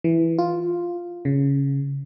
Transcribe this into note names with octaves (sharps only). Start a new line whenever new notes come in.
E3
F4
C#3